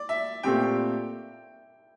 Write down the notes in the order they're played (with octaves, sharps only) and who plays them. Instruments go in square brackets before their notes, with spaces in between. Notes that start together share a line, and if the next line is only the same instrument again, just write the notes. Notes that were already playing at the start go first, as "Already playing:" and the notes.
Already playing: [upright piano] D5
E5
[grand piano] A#2 A3 C4 G4 [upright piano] G5